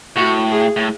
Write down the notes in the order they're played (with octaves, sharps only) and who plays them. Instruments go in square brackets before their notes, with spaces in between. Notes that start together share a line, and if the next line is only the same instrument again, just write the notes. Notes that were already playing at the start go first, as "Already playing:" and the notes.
[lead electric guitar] A2 [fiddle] F#4
[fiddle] G#4
[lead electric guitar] A2